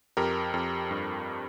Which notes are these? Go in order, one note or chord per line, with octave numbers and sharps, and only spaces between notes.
F2 G4 A#4
F2
G2